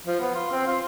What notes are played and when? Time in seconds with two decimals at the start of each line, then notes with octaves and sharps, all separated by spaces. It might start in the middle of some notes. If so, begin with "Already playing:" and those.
0.07 F3
0.20 B3
0.34 F4
0.51 C4
0.67 F4